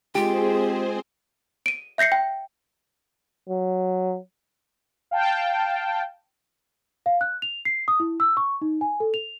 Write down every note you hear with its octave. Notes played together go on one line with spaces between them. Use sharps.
G#3 C4 F4 G4 G#4 C5
D7 D#7
E5 G6 A#6 C7 C#7
G5
F#3
F5 G5 A5
F5
F#6
F7
C7
D#6
E4
E6
C#6
D#4
G#5
A4
F7